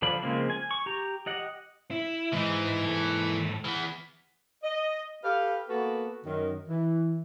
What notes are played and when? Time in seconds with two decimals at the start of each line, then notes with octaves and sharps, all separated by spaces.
0.02 D3 F3 D4 B5
0.22 C#3 F3 G#3 A#3 C4
0.50 G#5
0.71 C#6
0.86 G4 A#5
1.26 G4 D#5 F#5
1.91 E4
2.33 G#2 E3 D#4
2.84 G#2 A4
3.65 E3 B3
4.64 D#5
5.24 G4 A4 B4 F5
5.69 A#3 B3 F#4 A4 B4
6.25 F#2 D#3
6.68 E3